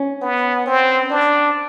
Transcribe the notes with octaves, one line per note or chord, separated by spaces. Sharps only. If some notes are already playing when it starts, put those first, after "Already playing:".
Already playing: C#4
B3
C4
D4